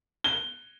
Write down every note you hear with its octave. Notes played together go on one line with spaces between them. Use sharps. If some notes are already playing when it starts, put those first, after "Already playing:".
G7